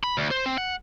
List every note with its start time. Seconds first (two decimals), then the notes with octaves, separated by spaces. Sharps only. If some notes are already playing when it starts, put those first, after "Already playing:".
0.04 B5
0.18 D2
0.31 C5
0.46 C4
0.58 F#5